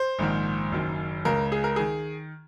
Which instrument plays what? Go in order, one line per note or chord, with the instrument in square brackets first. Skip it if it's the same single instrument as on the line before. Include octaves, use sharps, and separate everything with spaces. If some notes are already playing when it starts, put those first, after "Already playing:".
Already playing: [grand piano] C5
A#1 G#2 D#3
F#1 F#2 D#3
C#2 C#3 A#4
G#4
A#4
D#3 G#4